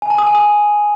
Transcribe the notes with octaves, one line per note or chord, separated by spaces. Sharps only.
G#5
A5
D#6
G#5
D#6